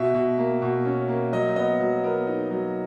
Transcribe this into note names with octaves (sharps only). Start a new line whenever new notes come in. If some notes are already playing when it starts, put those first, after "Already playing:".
Already playing: B2 E5
B2
A#3
B2
C#4
A#3
F#3 D#5
B3 D#5
F#3
B3 A#4
D#4
F#3